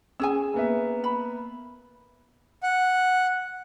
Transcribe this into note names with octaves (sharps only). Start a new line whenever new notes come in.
C#4 G#4 G#5 E6
A#3 B3 E5
B5
F#5